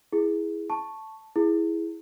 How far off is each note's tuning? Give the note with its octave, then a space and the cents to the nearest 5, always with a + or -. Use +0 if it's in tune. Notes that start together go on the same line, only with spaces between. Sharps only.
E4 +0 G#4 +0
A5 +0 C#6 -5
E4 +0 G#4 +0